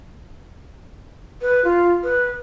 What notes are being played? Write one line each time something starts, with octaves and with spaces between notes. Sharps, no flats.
B4
F4
B4